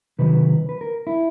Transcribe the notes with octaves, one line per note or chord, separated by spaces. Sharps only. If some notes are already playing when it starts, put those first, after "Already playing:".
C3 D#3 F#3 B4
B4
A#4
E4